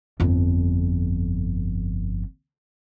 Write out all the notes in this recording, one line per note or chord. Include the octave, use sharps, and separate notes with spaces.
G1 F2